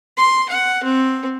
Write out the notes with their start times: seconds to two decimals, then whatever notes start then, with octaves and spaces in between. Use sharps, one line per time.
0.17 C6
0.49 F#5
0.83 C4